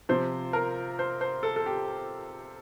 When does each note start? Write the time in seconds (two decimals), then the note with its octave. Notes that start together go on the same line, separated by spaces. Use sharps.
0.09 C3 F3 C5
0.53 A#4
0.99 C5
1.21 C5
1.43 A4
1.56 A4
1.66 G4